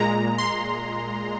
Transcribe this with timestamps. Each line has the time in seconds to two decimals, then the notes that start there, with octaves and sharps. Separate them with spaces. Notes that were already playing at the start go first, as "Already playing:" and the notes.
Already playing: A#2 G#3 A#5
0.38 C6